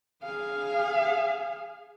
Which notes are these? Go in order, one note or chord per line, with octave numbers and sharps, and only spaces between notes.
G#4 F5